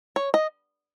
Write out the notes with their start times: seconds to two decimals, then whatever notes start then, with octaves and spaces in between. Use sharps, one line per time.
0.16 C#5
0.34 D#5